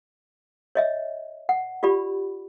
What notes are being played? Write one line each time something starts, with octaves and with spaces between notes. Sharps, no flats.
C#5 D#5 E5
F#5
F4 G4 D5 B5